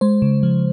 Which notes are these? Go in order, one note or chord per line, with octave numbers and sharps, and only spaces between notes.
G#3 C5
C#3
F3